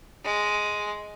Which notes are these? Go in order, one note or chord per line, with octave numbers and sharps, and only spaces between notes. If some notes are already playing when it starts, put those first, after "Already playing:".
G#3